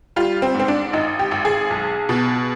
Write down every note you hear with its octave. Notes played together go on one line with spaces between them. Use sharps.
G3 F4
C4
G#2
C4
D4
G#1 D#4
G4
G#1
G#4
B1
B2